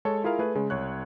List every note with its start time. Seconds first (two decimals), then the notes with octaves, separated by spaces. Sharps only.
0.05 G#3 A4 C#5
0.24 E4 F4 G#4 A#4 F5
0.39 A3 G#4 B4
0.55 C#3 G#3
0.70 C2 C#5 F#6